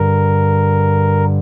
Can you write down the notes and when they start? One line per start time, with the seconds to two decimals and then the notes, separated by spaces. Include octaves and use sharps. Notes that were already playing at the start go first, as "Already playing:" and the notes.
Already playing: G2 D3 A#4